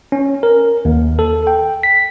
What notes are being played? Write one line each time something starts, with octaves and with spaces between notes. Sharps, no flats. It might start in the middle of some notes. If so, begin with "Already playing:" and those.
C#4
A#4
D#2
A4
G5
B6